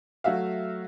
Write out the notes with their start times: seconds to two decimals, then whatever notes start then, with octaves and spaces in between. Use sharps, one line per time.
0.24 F#3 A3 F#4 E5 F5